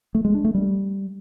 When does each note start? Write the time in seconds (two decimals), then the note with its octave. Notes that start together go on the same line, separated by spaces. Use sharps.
0.15 A3
0.25 G#3
0.35 D4
0.44 A3
0.54 G3